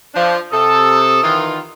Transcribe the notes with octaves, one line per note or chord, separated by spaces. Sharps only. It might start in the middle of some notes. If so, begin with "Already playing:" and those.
F3 D4
C3 A4 D#6
D#3 E3 F4